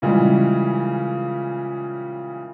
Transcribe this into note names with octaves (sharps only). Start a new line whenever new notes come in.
A#2 C#3 E3 G3 G#3